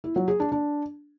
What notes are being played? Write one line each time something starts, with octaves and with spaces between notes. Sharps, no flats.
E4
F#3
G#4
D4
D4